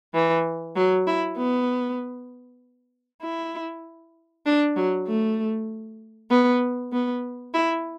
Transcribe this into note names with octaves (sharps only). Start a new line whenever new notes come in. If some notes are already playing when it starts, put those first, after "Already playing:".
E3
F#3
E4
B3
E4
D4
F#3
A3
B3
B3
E4